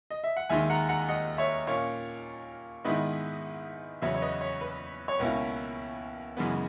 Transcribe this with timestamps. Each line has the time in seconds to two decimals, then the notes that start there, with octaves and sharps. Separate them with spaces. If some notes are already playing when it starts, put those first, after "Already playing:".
0.11 D#5
0.24 E5
0.37 F#5
0.49 D#2 D#3 G#3 D#4 E5 G#5
0.70 F#5 A#5
0.89 F#5 A#5
1.09 D#5 F#5
1.38 C#5 E5
1.67 A#2 A#3 C#4 C#5
2.84 G#2 D#3 G#3 B3 E4 B4 D#5
4.02 E2 C#3 F#3 B3 C#5 E5
4.15 C#5
4.22 B4 D#5
4.41 C#5
4.61 B4
5.08 C#5
5.19 C#2 B2 A#3 C#4 E4 B4
6.37 F#2 C#3 E3 G#3 B3